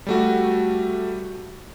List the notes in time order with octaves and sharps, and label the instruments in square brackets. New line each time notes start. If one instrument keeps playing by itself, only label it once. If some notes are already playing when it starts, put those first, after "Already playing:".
[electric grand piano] G3 A3 F#4